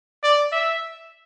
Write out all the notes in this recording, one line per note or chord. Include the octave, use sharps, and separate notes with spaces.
D5
E5